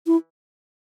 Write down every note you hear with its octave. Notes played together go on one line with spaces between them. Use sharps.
E4